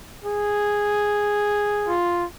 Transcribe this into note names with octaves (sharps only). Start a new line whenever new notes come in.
G#4
F4